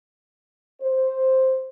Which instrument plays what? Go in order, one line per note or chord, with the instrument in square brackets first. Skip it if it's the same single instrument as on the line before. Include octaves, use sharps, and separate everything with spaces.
[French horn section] C5